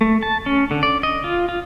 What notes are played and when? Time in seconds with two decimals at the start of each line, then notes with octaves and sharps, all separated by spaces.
0.01 A3
0.23 A5
0.46 C#4
0.71 D3
0.83 D5
1.03 D#5
1.24 F4
1.49 F4